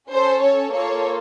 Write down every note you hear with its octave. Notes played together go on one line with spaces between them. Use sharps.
C#4 A4 C5
C#5
A#3 F4 A4 C#5